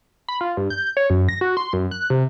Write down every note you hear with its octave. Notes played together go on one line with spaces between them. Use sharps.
B5
F4
G2
G6
C#5
F#2
A#6
F#4
C6
F#2
F#6
C3